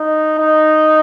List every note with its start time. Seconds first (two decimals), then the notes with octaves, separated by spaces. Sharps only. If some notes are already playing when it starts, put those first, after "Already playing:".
Already playing: D#4
0.39 D#4